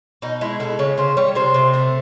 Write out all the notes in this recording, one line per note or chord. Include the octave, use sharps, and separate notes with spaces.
B2 D#4
G#3 E4
B2 A4
C#3 C#5
C#3 C5
G3 C#5
C3 C5
C3
A3